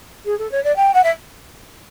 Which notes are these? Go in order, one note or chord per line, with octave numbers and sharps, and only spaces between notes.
G#4
A4
C#5
D5
G5
F#5
E5